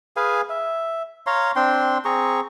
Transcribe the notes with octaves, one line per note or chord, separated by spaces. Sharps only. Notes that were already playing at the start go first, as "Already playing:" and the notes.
G#4 B4 F5 G#5
E5
C#5 F5 A#5 C6
C4 D4 G5 C6
C4 G#4 A#5 C#6